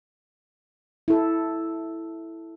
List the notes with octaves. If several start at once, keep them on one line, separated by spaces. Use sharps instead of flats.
E4 A4